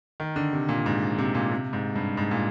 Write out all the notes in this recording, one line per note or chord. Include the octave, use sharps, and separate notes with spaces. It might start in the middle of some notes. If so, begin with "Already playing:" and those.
D#3
D3
C3
A#2
G#2
C3
A#2
C3
G#2
G2
G#2
A#2